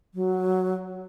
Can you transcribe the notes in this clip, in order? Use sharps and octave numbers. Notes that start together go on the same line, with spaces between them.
F#3